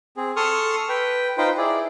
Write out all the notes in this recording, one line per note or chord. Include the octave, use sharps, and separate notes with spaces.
C4 G#4
A4 C6 C#6 D#6 F6
B4 G5
D#4 F4 B4 C5 G5
E4 G#4 D5